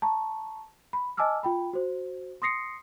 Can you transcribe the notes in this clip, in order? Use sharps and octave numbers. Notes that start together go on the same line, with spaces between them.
A5 A#5 C#6
B5
D#5 G#5 A5 D6 E6 F6
F4 G5 B5
F#4 C5
C6 D#6 A#6 C7 C#7